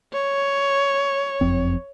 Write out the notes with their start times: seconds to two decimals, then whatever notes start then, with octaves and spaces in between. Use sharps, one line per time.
0.13 C#5
1.41 F#1 F2 C4